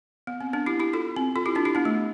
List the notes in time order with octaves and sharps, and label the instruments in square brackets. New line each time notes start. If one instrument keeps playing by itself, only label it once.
[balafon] B3
C4
B3 D4
E4 G4
E4 G4
F4 A4
C4
F4 A4
E4 G4
D4 F4
E4 G4
B3 D4
A3